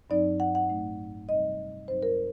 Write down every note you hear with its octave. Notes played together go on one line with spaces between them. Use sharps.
G2 F#3 C4 D#4 D5
F#5
F#5
A2 A3 D#4
C3 G3 C4 D#4 D#5
G2 F#3 C4 D#4 C5
A#4